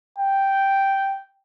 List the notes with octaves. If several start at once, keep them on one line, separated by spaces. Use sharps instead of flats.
G5